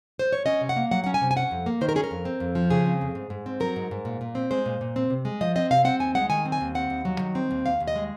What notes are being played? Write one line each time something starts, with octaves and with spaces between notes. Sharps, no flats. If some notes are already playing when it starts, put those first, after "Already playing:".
C5
C#5
C#4 D#5
C3
F#5
A#3
F#3 F#5
C#4 F#5
G#5
C3
G#5
C#4 F#5
F2
A#3
D#3 C5
A#4
C#4 G#4
A#4
F2
C4
F2
F3
C#3 G#4
C4
F2
G#2
G#2
C4
F#3 A#4
G#2
G#2
A#2
A#2
C4
G#3 C5
A#2
A#2
C4
C3
G#3
F3 D#5
C4 D#5
C3 F5
C4 F#5
D#2 G#5
G#3 F#5
D#3 G#5
C4
G#5
D#2
C4 F#5
D#2
F#3
D#3
C4
D#2
D#2 F5
D#2
D#5
G#3